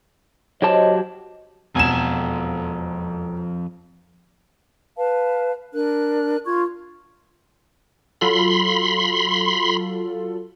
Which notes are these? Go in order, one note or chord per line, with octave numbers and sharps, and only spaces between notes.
F#3 G4 C5 C#5 D#5 A5
E1 F2 G#5 E7
B4 F5 A5
D4 A#4 F#6
F4 C#6 G#6
F#3 F4 A4 B5 C6